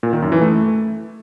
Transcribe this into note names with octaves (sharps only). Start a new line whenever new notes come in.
A#2
D#3
F#2
E3
A3